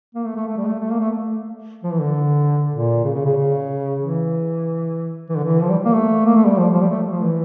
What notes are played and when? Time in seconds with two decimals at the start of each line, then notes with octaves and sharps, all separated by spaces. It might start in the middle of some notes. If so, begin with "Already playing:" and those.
0.15 A#3
0.26 A3
0.36 A3
0.48 A3
0.57 G3
0.68 A3
0.80 A3
0.91 A#3
1.00 A3
1.84 F3
1.92 E3
2.00 D3
2.72 A#2
3.04 C#3
3.14 C#3
3.25 C#3
3.37 C#3
4.01 E3
5.29 E3
5.37 D3
5.44 E3
5.61 F3
5.69 G3
5.85 A#3
5.93 A3
6.26 A#3
6.36 A3
6.47 G3
6.58 F3
6.74 F3
6.82 G3
6.90 A3
7.11 F3
7.22 E3